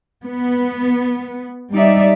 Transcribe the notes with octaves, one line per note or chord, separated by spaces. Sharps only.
B3
G3 D#4 D5 E5